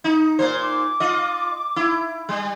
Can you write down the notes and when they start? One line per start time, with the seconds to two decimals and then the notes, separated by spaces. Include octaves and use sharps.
0.04 D#4
0.39 A#2 C5
0.62 D6
1.00 F4 D#5
1.76 E4
2.29 G3